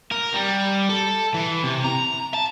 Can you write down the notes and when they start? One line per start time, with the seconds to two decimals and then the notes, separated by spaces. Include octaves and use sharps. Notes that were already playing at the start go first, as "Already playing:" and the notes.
0.11 A#4
0.34 G3
0.89 A4
1.34 E3
1.63 C3
1.84 A#5
2.34 A5